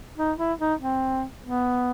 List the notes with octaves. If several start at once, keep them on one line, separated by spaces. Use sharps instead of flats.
D#4
E4
D#4
C4
B3